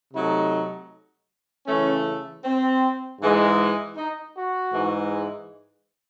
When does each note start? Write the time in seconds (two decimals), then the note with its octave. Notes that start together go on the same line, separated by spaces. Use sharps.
0.14 C3 F#3 A3 D#4
1.67 C#3 E3 A3 C#4
2.43 C4
3.20 G#2 E3 G#3
3.96 D#4
4.35 F#4
4.73 G#2 E3 G#3